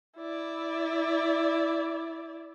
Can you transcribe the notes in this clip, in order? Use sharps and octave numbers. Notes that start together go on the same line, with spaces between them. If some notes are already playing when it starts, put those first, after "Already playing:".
E4 D5